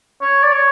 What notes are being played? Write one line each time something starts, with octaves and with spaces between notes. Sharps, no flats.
C#5
D5
C#5